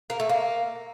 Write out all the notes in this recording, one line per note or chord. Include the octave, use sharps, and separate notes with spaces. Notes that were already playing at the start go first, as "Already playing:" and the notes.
A#3
A3
A#3